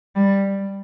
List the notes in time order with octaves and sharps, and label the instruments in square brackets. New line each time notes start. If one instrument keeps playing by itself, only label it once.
[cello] G3